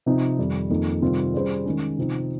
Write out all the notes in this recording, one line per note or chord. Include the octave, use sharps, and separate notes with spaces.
C3 F3 C4 D#4
F2 D#3 G3
F2 D#3 A#3 D#4
C3 D#3 G3 C4 F4
G3 C#4 G#4 C5
D#3 G#3 C#4
C3 F3 C4 D#4